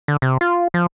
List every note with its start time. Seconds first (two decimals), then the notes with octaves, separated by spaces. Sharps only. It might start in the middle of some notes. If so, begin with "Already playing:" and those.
0.08 D3
0.22 C3
0.41 F4
0.74 F3